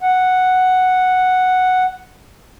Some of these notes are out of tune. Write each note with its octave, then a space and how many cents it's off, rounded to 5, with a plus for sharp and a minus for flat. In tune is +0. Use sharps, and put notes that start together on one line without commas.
F#5 +0